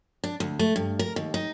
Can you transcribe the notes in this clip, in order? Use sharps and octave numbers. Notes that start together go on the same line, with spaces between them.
D4
D2
A3
G2
A#4
D#2
D#4